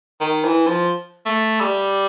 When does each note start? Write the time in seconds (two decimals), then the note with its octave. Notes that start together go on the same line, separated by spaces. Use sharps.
0.21 D#3
0.44 E3
0.67 F3
1.26 A3
1.61 G3